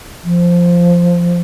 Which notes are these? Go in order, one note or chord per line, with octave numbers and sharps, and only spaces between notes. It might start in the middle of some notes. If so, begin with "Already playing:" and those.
F3